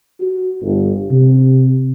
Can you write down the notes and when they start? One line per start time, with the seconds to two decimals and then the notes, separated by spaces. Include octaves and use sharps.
0.20 F#4
0.62 G1
1.10 C3